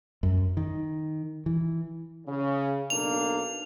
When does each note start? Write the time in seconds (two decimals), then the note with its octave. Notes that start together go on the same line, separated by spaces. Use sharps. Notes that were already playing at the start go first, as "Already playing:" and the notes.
0.23 F#2
0.57 D#3
1.46 E3
2.26 C#3
2.90 B1 A#3 D4 F7